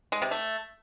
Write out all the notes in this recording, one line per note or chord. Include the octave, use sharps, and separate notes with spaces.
G#3
C3
A3